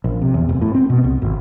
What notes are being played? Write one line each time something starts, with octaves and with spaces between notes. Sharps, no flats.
A#1
C3
E2
F1
A2
C4
B2
C2
G#1